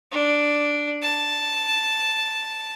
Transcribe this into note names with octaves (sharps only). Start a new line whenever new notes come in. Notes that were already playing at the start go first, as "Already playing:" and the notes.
D4
A5